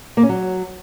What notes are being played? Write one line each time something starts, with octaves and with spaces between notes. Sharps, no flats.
A#3
C#4
F#3